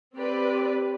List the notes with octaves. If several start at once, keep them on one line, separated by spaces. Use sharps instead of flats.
C4 G4 B4 D5